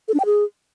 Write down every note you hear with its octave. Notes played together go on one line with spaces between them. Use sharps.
A4
D4
G5
G#4